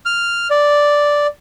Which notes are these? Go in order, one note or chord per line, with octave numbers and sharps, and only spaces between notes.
F6
D5